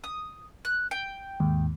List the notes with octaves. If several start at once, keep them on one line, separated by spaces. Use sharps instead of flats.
D#6
F#6
G5
D#2 G#2